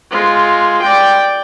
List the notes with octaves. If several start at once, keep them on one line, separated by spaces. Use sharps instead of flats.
G#3 F4
D5 G5